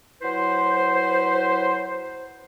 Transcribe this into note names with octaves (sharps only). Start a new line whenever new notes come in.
F#3 E4 B4 C5